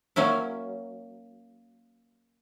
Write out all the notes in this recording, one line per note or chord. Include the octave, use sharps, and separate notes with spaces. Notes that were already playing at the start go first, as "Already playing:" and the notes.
F#3 A#3 C#4 E4